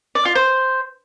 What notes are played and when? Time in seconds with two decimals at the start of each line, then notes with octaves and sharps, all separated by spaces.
0.15 D5
0.25 F4
0.35 C5